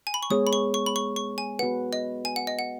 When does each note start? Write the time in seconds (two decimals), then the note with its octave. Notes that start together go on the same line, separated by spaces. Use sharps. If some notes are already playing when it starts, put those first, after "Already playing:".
0.07 G#5
0.14 B5
0.23 C#6
0.30 G#3 B3 G#4 C#5 D#6
0.47 B5
0.53 C#6
0.74 C#6
0.86 B5
0.96 C#6
1.16 C#6
1.38 G#5
1.59 B3 F#4 B4 F#5
1.93 D#5
2.25 G#5
2.36 F#5
2.47 D#5
2.59 F#5